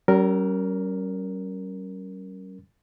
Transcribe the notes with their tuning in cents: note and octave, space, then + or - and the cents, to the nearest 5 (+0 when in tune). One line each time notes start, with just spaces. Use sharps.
G3 -45 C#4 +0 A#4 +0